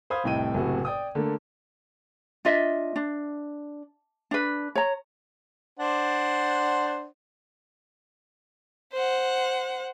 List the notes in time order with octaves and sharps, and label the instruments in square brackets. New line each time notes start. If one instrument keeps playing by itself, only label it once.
[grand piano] C5 F5 B5 D#6 G#6
F1 C2 A2 D#5 G5 D#7
F#1 A2 C3 F#4
D5 G5 D#6
D3 A3 A#3
[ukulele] D4 F4 D#5 E5
D4
D4 B4
C#5 A#5
[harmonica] D4 C5 F#5
[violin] C5 F#5